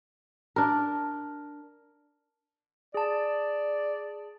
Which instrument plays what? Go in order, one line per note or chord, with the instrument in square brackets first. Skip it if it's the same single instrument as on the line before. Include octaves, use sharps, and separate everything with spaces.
[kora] D4 A#4
[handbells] G#4 A5 [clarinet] D5